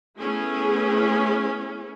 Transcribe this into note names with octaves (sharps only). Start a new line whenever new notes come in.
A3 B3 C#4 E4 G#4